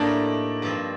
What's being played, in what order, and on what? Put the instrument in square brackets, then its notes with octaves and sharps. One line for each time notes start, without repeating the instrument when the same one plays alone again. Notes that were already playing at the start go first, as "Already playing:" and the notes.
Already playing: [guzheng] A2 A3 D#4 G4 [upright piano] A#3 D4
[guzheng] G2 F3 C4